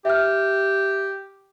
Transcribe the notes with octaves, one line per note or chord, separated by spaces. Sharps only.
G4 E5 F6